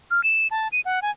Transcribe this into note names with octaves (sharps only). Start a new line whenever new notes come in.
F6
E7
A5
D#7
F#5
G#5